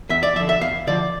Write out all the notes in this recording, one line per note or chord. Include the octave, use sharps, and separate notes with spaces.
E2 E5
D5
D3 F3 E5
E5
E2 F5
D3 F3 D5